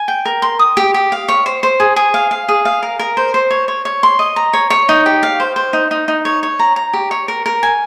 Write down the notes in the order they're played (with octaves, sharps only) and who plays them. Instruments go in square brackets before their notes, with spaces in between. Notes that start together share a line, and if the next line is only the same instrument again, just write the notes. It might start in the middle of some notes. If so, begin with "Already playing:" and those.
Already playing: [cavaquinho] G#5
G5
A#4
C6
D#6
G4
G4
F5
C#5
C5
C5
G#4
G#4
F5
F5
G#4
F5
A#4
A#4
C5
C5
C#5
C#5
C#5
C6
D#5
A#5
C#5
C#5
D#4
G4
F5
C5
C5
D#4
D#4
D#4
C#5
C#5
A#5
A#5
G4
C#5
A#4
A#4
G#5